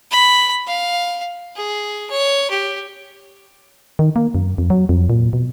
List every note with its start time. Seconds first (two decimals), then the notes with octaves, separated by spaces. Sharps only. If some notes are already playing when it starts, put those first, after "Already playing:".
0.11 B5
0.67 F5
1.56 G#4
2.10 C#5
2.50 G4
3.99 D#3
4.16 A#3
4.35 F#2
4.58 F2
4.70 F#3
4.89 F2
5.10 A#2
5.33 B2